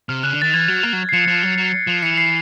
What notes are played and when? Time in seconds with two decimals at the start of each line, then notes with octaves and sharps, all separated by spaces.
0.09 C3 F6
0.23 C#3 F#6
0.33 D3
0.42 D#3 A6
0.53 E3 G#6
0.68 F#3
0.83 A#3
0.93 F#3
1.09 C7
1.13 F3 C#7
1.28 F3
1.43 F#3
1.58 F#3
1.87 F3
2.02 E3 C#7
2.17 C7